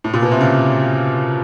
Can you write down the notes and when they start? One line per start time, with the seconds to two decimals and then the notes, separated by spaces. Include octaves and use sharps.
0.04 A2
0.13 A#2
0.22 B2
0.31 C3
0.41 C#3